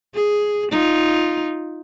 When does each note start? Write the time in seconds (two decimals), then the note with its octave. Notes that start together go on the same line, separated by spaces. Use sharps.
0.15 G#4
0.71 D#4 F4